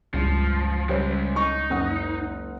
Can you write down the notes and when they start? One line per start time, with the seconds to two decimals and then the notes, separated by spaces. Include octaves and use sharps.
0.14 C#2 G2 F3
0.89 C#3 G3 G#3 C5 C#5
1.36 D#4 C#6
1.70 F#1 F#5 D#6